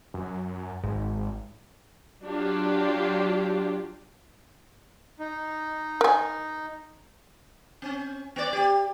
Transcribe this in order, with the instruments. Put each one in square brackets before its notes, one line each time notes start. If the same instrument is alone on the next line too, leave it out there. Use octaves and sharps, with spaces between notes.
[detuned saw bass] F#2
[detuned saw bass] G#1 [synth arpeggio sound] G#2
[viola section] F#3 D4 F4 G4
[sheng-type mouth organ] D#4
[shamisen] A#4 G#5
[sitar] C4 C#4
B3 D5
G4